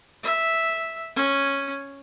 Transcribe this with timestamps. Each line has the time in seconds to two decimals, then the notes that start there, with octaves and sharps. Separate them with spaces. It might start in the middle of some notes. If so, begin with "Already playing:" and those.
0.23 E5
1.16 C#4